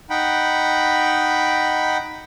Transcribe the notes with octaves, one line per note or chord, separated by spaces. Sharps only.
D#4 F#5 G5 B5